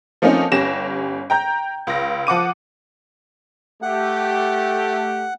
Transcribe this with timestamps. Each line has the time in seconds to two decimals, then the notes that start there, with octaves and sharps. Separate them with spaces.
0.22 F3 A3 A#3 C4 C#4 D#4
0.52 G1 C#4 G4 A#6 E7
1.30 G5 A#5 G6
1.87 C#2 A#6
2.27 F3 F#5 D6 D#7
3.82 A3 G4 F#5